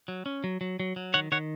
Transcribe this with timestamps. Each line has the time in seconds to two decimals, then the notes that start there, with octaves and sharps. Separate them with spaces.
0.08 F#3
0.26 C#4
0.44 F#3
0.61 F#3
0.80 F#3
0.96 F#3
1.14 D#3 C#5 F#5
1.32 D#3 C#5 F#5